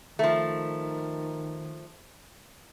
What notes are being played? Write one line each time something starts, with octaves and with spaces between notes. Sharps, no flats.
D#3 F3 A3